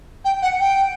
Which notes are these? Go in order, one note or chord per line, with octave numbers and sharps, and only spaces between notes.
G5
F#5
G5